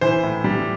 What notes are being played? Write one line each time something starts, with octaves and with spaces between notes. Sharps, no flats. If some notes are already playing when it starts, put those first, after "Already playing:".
E3 C5
A2
G3